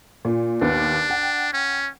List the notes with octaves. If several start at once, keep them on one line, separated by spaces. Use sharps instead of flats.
A#2
D#2 B3 D4
F#5 G5
C#4